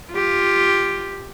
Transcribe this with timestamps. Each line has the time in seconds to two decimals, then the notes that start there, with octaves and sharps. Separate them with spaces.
0.12 F4 G4